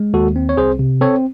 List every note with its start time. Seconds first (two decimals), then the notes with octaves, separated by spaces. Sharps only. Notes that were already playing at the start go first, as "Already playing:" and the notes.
Already playing: G#3
0.13 D#2 F#4 A4
0.36 C4
0.49 C#5
0.57 C2 G#4 C5
0.79 C3
1.01 C4 A4 C#5